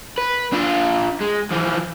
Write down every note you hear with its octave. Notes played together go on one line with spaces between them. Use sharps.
B4
D4 F4
G#3
E3 F3